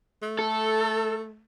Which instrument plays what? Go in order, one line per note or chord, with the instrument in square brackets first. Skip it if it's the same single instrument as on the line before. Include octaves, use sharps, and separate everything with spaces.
[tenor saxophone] A3
[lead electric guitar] A4